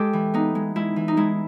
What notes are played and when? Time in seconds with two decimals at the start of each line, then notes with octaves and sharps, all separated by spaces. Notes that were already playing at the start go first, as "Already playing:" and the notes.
Already playing: G#3 G4 A4
0.13 E3
0.34 B3 D#4
0.55 G#3
0.76 G#3 E4
0.96 E3
1.08 D#4
1.17 G#3 E4